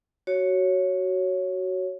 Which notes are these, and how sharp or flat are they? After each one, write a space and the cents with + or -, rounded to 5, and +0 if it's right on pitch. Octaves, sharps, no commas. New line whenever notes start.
F#4 +15 C#5 +0